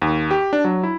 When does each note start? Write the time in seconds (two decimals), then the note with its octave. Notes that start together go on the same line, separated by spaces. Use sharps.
0.02 D#2
0.31 G4
0.53 D4
0.64 F#3
0.83 E4